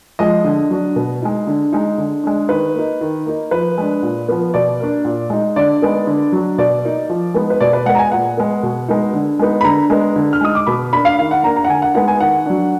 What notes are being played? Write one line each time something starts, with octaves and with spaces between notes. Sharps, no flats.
F3 G#3 D#5
D3
F#3 D4
B2
G#3 D#4
D3
G#3 D#4
D3
G#3 D4
D#3 B4
A#3 D#4
D#3
A#3 D#4
F3 B4
G#3 D4
A#2
F3 B3
B2 D5
A#3 D4
A#2
G#3 D#4
D3 D5
G#3 B3 D#4
D3
F#3 D4
B2 D5
A#3 D#4
F3
G#3 B3 D#4
B4
B2 D5
B4
G#3 B3 F#5
A#5
G#5
A#2 F#5
G#3 B3
B2
G#3 B3 D#4
D3
G#3 B3 D#4
B5
D3 A#5
G#3 B3 D4
D3
F6
G#3 D#4 D#6
D6
B2 B5
A#3 D4 B5
F5
D#3 F5
F#5
A#3 D4 A#5
A#5
F#5
D3 G#5
F#5
G#3 B3 D#4 F#5
G#5
D#3 F#5
F#3 D4